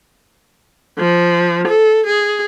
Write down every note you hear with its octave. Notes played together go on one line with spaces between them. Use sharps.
F3
A4
G#4